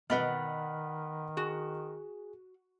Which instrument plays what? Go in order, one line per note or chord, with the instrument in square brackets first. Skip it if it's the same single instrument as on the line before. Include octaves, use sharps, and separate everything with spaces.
[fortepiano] B2 B4 [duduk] D#3 [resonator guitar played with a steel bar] D5 D#5 [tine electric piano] F#5 B5 F6
[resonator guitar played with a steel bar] F#4 [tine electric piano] G#4